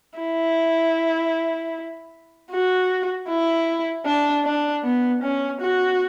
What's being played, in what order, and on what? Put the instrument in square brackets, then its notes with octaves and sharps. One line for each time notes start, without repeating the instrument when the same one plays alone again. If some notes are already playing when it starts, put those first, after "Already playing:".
[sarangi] E4
F#4
E4
D4
D4
B3
C#4
F#4